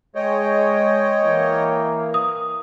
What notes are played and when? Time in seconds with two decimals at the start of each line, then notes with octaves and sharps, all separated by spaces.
0.15 G#3 C#5 D#5 G5
1.24 E3 A#3
2.14 D#6